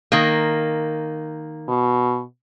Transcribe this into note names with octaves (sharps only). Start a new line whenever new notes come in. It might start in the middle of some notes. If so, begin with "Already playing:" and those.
D#3 A#3
B2